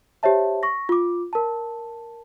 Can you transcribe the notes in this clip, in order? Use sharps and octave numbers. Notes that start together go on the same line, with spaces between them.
G4 C5 C#5 E5 A5
C#6 A#6
F4 D6
A#4 A5